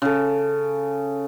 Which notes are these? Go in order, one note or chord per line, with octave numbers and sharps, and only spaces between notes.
C#3 A4